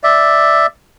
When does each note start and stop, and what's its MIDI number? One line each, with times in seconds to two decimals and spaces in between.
0.03 0.66 74
0.03 0.66 76